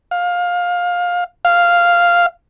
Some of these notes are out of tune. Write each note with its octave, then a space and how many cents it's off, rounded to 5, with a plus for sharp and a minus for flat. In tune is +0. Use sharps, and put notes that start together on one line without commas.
F5 +20
F5 -5